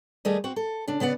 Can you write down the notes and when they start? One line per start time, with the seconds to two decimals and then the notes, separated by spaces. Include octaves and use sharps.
0.25 D#2 G3 A3 G4 G#4 D#5
0.44 C4 F#4
0.56 A4
0.88 C#3 D4
1.00 C#3 B3 D5 F#5